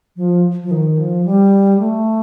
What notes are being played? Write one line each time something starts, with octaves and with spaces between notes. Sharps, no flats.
F3
F3
D#3
F3
G3
A3